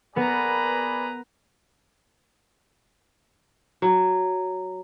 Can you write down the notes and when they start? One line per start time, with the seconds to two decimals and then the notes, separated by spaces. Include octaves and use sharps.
0.16 B3 G#4 A#4 B4 D5 A#5 B5
3.82 F#3